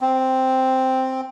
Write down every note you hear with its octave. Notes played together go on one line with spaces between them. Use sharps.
C4